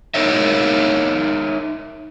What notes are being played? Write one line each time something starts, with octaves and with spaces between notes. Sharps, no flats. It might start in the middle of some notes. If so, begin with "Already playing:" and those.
D#4 A#4 C#5 D#5 E5